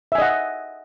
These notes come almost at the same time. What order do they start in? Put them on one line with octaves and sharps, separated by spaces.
E5 G#5 D#5 F#5